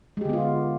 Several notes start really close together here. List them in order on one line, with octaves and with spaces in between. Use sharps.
G#3 G4 D3 B3 F4